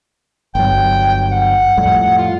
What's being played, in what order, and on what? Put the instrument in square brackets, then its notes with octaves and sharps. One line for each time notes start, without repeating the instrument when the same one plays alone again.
[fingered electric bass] G1 F#3 [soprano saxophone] G5
[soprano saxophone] F#5
[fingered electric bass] F2 A2 G3
[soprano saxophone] F4